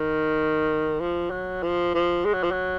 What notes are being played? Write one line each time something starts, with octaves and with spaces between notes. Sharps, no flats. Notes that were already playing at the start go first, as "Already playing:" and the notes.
Already playing: D#3
F3
F#3
F3
F3
G#3
F#3
F3
F#3